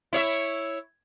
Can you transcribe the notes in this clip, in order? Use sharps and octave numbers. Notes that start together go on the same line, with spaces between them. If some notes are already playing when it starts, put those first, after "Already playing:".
E4 C#5 E5